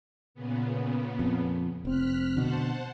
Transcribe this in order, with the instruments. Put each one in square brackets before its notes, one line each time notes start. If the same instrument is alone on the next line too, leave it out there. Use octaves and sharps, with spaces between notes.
[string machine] A#2 C#3 B3
[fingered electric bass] F2
[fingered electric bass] F1 C4 [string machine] F6 F#6 B6
[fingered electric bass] B2 D3 [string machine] C5 F#5 A5